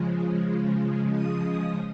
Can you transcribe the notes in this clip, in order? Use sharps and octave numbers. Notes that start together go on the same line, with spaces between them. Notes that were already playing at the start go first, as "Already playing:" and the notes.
Already playing: C#3 F3 G#3
D#6